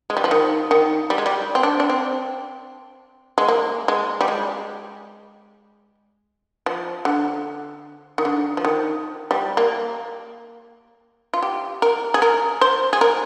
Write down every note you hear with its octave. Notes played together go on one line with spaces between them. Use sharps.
G#3
G3
F3
D#3
D#3
G3
G#3
G3
C4
D4
D4
C4
G#3
A#3
G#3
G3
G#3
F3
D3
D#3
D3
F3
D#3
G3
A#3
F4
G4
A#4
G#4
A#4
C5
G#4
A#4